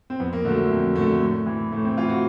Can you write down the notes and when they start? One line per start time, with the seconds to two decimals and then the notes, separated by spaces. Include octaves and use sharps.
0.10 C4
0.20 F2 B3
0.33 A#3
0.45 D3 A3
0.49 F#3
0.58 A3
0.71 F2
0.96 D3 F#3 A3
1.21 A2
1.46 E3
1.72 A2 A3
1.84 C4
1.97 E3 F4
2.09 F#4